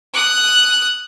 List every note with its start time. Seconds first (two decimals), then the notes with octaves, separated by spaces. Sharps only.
0.14 D#6 F#6